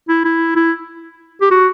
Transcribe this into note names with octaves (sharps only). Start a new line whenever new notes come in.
E4
E4
E4
G4
F#4